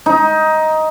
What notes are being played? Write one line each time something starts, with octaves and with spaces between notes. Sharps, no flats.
D#4